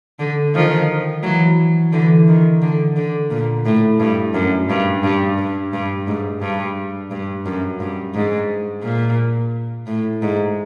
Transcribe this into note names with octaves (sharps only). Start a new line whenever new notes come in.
D3
D#3 F3
E3 F#3
D3 E3
D#3
D3
D3
A#2
A2
G2
F#2
G2
G2
G2
G2
G#2
G2
G2
F#2
G2
G#2
A#2
A2
G#2